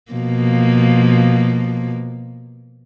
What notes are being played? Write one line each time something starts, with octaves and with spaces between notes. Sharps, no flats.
B2 F3 A#3